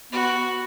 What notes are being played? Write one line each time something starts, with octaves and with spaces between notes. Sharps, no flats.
B3 F#4